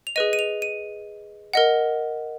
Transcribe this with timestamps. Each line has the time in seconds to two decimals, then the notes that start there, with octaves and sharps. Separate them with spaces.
0.07 F7
0.16 G#4 B4 D#5 D#7
0.33 D#7
0.39 F7
0.62 D#7
1.54 A#4 D#5 F#5